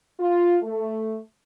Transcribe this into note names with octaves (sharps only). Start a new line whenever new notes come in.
F4
A3